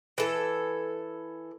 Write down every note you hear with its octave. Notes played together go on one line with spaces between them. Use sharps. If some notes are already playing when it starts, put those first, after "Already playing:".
E3 A4